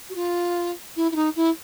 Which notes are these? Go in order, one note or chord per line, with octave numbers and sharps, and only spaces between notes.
F#4
F4
E4
E4
D#4
E4